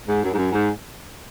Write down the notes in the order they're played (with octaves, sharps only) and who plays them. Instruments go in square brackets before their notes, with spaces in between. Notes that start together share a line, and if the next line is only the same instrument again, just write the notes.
[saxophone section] G#2
F#2
G#2
F#2
G#2